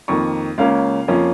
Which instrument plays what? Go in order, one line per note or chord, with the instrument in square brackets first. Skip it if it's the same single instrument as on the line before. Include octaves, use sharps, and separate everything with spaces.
[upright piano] F2 D#3 A#3 C#6
C#2 C#3 A#3 C#4 F5
F2 F3 A#3 C#4